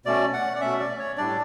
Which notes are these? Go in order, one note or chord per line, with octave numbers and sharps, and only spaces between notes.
B2 A3 C#4 D5
F#5
D5
B2 A3 C#4 E5
D5
C#5
A2 G3 D4 D5